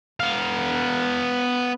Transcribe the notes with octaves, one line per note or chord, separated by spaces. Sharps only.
B3 F5